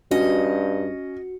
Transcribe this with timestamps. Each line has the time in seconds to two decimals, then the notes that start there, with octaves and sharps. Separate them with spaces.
0.11 G2 C#4 F#4 D#5